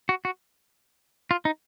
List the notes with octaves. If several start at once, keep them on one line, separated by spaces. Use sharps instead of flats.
F#4
F#4
F4
D#4